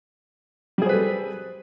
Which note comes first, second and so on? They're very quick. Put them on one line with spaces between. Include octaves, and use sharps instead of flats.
G3 G#4 C5 B4 A4